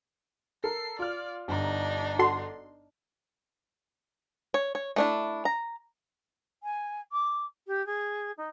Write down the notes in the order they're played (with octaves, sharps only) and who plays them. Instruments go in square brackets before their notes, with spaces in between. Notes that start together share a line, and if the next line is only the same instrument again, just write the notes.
[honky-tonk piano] A4 A#4 [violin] C7
[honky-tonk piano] F4 F6 [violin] D5
[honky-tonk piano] G1 A#5 [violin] D4 D#4
[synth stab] F#4 A4 C6
[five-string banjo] C#5
C#5
A3 D4 E4
A#5
[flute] G#5
D6
G4
G#4
D#4